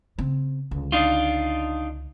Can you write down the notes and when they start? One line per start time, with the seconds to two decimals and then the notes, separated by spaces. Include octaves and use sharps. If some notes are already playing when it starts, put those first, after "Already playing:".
0.18 C#3 C4
0.71 C#2 D3
0.92 D4 D#4 F4